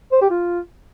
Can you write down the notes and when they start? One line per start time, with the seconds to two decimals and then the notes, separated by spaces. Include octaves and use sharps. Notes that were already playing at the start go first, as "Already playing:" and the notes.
0.12 C5
0.21 G4
0.30 F4